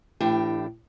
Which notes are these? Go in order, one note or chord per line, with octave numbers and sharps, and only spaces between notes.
A2 E3 D4 G4 G5